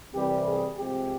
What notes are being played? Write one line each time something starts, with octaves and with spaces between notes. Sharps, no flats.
C2 C3 E3 G3 G4
G#4
C2 C3 F3 G#3 G4